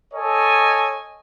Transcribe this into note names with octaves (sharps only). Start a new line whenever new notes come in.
A4 C#5 D#5 G#5